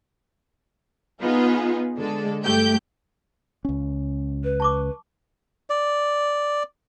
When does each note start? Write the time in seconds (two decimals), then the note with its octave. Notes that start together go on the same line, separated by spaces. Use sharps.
1.21 B3 D#4 F4 G#4 B4
1.98 D3 G#3 A4
2.43 G2 A3 G4 G6
3.65 C#2 C#4
4.44 B4
4.60 A5 C#6 D6
5.70 D5